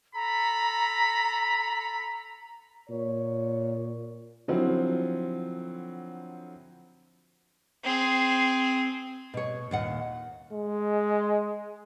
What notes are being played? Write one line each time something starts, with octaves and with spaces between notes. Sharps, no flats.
A4 A#5 B5
A#2 C#5
D3 F3 F#3 C4 E4
C4 G#4
B2 C#5
D#2 A#2 F#5
G#3